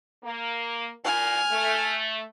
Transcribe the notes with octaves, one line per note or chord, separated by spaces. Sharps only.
A#3
A#2 G#5 F6
A3